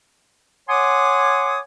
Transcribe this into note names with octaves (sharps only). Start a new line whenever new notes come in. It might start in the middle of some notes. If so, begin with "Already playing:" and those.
C#5 F#5 G#5 C6 D6 D#6